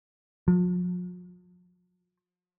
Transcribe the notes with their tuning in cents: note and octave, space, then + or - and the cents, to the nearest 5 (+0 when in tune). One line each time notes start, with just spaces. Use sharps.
F3 +45